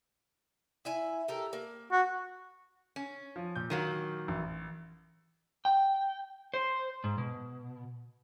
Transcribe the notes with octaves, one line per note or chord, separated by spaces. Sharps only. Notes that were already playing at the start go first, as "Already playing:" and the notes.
E4 E5 G#5
G4 A4 A#4
A#3
F#4
C#4
F3
A#2 G6
D#3 F#3 A#3
A1
G5
C5
G#2
B2